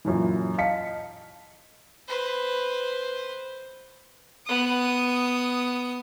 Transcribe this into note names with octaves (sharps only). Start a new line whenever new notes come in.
F#2 A#2 E3
D#5 F5 A5 B6 C#7
B4 C5
B3 D#6